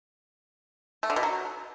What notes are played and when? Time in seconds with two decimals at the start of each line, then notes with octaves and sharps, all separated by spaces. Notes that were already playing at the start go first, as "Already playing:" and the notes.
1.03 A3
1.10 D3
1.16 B2
1.23 F#3